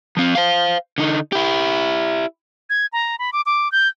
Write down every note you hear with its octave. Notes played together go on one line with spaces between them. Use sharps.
F3 C4
C5 F5
D3 D#4
E4 G4
G#6
A#5
B5
D6
D6
G6